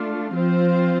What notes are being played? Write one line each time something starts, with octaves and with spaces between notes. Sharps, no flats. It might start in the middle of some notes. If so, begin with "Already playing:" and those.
Already playing: A3 D4 F4
F3 C4 F4 C5